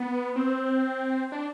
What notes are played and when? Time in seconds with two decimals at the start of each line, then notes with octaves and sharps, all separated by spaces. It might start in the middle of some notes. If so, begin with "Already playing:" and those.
Already playing: B3
0.36 C4
1.32 D4